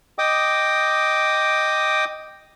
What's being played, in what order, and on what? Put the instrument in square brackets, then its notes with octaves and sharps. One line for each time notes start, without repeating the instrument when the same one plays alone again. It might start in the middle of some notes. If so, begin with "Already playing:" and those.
[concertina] D#5 G5 D6 D#6